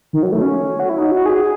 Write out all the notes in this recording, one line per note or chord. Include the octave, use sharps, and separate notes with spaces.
D#3
F#3
A3
C#4
F#4
E4
D#4
F#4
G#4